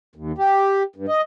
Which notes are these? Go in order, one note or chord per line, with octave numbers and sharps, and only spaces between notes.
D#2
G4
G2
D#5